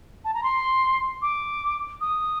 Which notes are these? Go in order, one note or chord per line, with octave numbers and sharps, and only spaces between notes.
A5
A#5
C6
D6
D#6